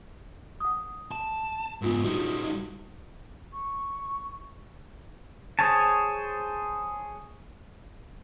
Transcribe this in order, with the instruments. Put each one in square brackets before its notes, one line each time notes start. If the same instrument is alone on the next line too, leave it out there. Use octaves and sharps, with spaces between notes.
[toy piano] F#5 D#6
[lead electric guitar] A5
[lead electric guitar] G#2 B3 [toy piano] D4 F4 A#4
[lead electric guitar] G3 D#4 [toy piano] F#4
[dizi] C#6
[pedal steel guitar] G#4 C5 C#5 G#5 A5